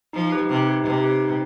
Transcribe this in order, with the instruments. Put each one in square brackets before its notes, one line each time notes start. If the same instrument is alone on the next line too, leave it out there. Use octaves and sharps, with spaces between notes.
[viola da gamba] F3 [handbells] D#4
[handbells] G4 B4
[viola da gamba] C3 [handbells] D#4
[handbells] G4 B4
[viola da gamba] C3 [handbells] D#4
[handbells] G4 B4
D#4